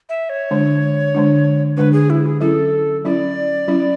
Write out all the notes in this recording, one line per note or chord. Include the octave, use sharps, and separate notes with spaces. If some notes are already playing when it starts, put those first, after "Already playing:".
E5
C#5
D3 G#3 D4
D3 G#3 D4
D3 G#3 D4 B4
G#4
E4
G#4
F#3 C#4 E4 A4
F#3 C#4 E4 D5
F#3 C#4 E4